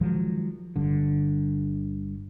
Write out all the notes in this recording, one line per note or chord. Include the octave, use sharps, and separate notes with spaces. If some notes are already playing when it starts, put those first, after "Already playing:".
D#3 F3 F#3 G#3
G1 G2 D3